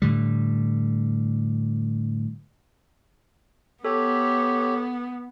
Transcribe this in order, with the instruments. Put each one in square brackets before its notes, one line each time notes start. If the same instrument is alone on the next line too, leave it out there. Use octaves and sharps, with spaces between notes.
[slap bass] A2 D3 G3
[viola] B3 [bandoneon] G4 C#5 [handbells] A4